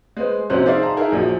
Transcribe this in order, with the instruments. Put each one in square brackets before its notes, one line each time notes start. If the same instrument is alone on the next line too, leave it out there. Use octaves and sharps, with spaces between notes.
[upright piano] G#3 B4 C5
A#1 C3 F#3 C#4 C5 F#6
D#4 G#4 C5 D5 E5 F5
A5 A#5
D#4 E4 G#4 A#4
A#1 A#2 F3 F#3